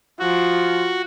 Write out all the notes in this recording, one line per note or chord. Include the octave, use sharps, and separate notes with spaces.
F3 F#4